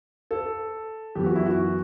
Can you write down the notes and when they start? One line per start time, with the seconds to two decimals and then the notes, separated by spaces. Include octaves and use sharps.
0.31 A4
1.15 F#2 E3 B3 G4
1.26 F#4
1.36 E4
1.46 F#4